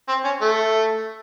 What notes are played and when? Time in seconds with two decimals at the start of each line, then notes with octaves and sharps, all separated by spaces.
0.08 C4
0.24 C#4
0.41 A3